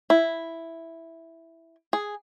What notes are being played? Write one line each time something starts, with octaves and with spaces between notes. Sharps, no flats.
E4
G#4